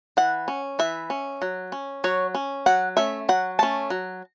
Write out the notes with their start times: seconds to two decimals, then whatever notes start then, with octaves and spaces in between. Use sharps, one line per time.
0.17 E3 F#5
0.48 C#4
0.79 E3 E5
1.10 C#4
1.42 F#3
1.72 C#4
2.04 F#3 C#5
2.35 C#4
2.66 F#3 F#5
2.97 A3 C#4 E5
3.29 F#3 F#5
3.59 A3 C#4 A5
3.90 F#3